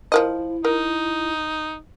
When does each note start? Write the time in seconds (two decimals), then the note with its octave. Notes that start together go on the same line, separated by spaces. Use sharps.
0.12 F3 E4 A#4 D#5
0.65 D#4 A#4